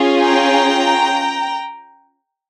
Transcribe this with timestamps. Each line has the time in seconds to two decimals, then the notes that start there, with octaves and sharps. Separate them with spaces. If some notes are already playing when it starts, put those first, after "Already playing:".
Already playing: C#4 F4 G#4
0.21 G5 A#5